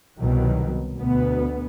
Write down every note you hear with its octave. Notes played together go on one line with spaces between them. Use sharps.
C2 B2 D#3 F#3
D2 B2 B3